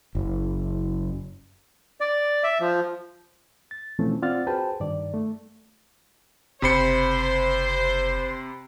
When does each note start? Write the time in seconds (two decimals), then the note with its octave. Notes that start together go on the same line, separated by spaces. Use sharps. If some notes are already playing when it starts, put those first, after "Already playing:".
0.15 F#1
2.01 D5
2.43 E5
2.60 F3
3.71 A6
3.99 B2 E3 F3 A3 C4 C#4
4.22 C4 F4 D5 F#5 F6 A6
4.47 F#4 G#4 B4 C5 G5 A5
4.80 G2 D#3 D5
5.14 A3
6.62 F#1 C3 C5 B5 C#7